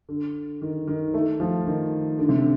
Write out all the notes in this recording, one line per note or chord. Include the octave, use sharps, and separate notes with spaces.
D3
D#3
D#3
A3
F3
D#3
D3
C3
D3